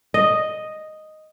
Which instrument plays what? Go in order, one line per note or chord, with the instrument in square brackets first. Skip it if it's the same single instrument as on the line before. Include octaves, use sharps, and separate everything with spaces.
[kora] D#5